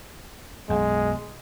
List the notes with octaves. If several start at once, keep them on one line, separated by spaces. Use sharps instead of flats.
B1 F#2 G#3